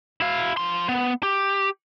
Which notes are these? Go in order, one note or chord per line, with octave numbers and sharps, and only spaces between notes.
E4 F5
F3 C6
B3
G4